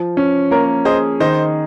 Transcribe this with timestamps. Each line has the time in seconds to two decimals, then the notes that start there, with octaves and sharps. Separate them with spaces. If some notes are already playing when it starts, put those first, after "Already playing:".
Already playing: F3
0.17 C#4
0.51 A#3 A#4 C#5
0.85 G#4 C5 D#5
1.20 D#3 C5 D#5